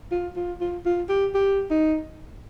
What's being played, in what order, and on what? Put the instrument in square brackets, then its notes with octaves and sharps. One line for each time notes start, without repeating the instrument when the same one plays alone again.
[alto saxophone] F4
F4
F4
F4
G4
G4
D#4